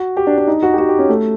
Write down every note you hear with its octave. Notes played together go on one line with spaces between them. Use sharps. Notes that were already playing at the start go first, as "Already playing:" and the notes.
Already playing: F#4
G4
D4
D4
D#4
F#4
G4
F#4
G4
C#4
A3